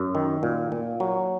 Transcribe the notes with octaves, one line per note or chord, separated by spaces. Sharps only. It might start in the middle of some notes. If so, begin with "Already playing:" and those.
Already playing: F#2
D#3
A#2
A#2
F#3